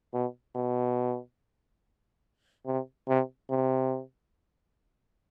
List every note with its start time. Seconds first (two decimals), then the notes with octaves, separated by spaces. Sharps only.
0.13 B2
0.55 B2
2.66 C3
3.08 C3
3.50 C3